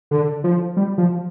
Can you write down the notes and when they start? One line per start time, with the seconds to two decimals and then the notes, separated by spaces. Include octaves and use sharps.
0.11 D3
0.44 F3
0.77 G3
0.98 F3